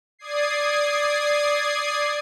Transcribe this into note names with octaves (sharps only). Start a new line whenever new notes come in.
D5 D#6 G#6 C7